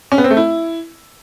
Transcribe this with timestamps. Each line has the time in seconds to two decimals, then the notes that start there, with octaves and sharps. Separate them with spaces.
0.12 C#4
0.18 B3
0.24 C4
0.31 A3
0.37 E4